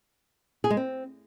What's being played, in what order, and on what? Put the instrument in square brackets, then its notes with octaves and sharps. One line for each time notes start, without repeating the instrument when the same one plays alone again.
[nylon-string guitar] G#4
G#3
C4